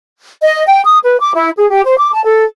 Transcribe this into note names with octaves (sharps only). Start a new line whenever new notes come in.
D#5
G5
D#6
B4
D6
E4
G#4
G4
C5
D6
A5
A4